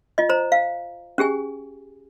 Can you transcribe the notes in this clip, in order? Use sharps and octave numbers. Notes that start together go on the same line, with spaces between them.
F4 D#5
C5 A#5
F5
C#4 G4 G#4 G#5